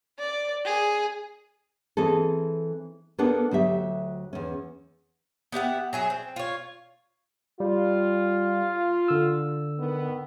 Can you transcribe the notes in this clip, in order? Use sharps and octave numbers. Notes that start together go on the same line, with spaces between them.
D5
G#4
E3 C4 G#4 A4
A#3 B3 D4 A4
D2 F#3 G4 E5
E2 C#4
B3 G4 E5 F#5
F#3 G#4 E5
C4
F4 C#5
G3 F4
D3 E6
D#3 B3